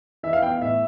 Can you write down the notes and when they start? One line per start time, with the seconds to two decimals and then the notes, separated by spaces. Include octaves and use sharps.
0.23 E3 E5
0.33 F5
0.42 B3 G5
0.52 F5
0.61 A2 E5